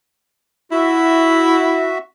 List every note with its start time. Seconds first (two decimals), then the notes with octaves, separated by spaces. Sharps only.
0.71 E4 F#4 E5